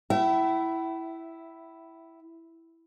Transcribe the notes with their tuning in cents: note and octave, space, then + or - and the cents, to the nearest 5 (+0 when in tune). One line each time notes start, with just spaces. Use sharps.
E4 +0 E5 +15 G5 -45